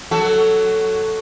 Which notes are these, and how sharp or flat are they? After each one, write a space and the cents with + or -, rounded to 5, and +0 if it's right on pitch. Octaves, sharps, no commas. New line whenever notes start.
F#3 +0 F#4 +15 A4 +0